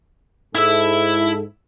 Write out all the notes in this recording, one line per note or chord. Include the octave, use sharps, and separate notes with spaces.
G#2 E4 A4 E5